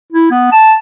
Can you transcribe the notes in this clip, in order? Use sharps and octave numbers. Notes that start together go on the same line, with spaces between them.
E4
B3
A5